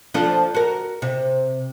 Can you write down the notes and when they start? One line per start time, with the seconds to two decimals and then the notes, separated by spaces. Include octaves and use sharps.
0.14 F3 D4 A4
0.54 F#4 A#4
1.02 C3